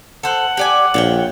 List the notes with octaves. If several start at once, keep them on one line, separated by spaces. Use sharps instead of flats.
A4 C5 F#5
G4 D5 G#5
A#1 A#2 C#5 G5